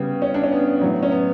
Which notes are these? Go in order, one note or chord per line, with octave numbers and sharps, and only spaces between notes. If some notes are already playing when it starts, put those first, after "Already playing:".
Already playing: C#3 G3 B3
C#4
D4
C#4
B3
A2 F#3
C#4
B3